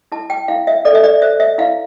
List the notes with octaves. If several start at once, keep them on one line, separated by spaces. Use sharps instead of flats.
E4 A5
G5
E4 F5
E5
A4 D5
E5
D5
C5 E5
E5
E4 F5